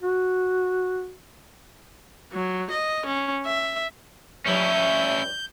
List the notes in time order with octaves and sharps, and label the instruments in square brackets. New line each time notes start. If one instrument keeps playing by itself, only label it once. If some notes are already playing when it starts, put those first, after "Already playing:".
[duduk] F#4
[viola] F#3
D#5
C#4
E5
[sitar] G2 F3 C#5 [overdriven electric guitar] C#4 E4 [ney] E5 [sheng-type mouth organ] G6